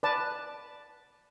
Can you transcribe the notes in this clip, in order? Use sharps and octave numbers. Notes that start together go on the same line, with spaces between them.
B4 D5 A5